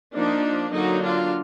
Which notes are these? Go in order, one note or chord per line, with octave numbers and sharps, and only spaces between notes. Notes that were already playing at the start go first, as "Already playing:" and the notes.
F3 A#3 D4 D#4
D3 F#3 A#3 D#4 F#4
D4 F4